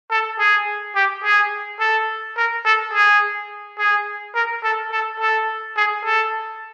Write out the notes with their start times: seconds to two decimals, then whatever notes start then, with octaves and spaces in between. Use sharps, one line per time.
0.10 A4
0.39 G#4
0.95 G4
1.24 G#4
1.80 A4
2.37 A#4
2.65 A4
2.94 G#4
3.78 G#4
4.35 A#4
4.64 A4
4.92 A4
5.20 A4
5.77 G#4
6.05 A4